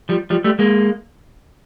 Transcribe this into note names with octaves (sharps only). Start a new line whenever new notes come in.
F3 G3
F3 G3
G3 A3
G#3 A#3